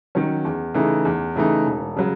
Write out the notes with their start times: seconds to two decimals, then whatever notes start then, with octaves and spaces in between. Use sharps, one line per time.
0.15 D#3 F#3 C#4
0.45 E2
0.74 C#3 E3 A3 D#4
1.05 E2
1.36 C#3 E3 A3 D#4
1.66 E1
1.97 C#3 F#3